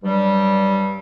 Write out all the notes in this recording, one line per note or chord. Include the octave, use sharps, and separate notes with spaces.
G2 F#3 G3